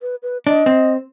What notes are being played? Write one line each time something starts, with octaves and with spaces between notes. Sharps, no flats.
B4
B4
D4 D#5
C4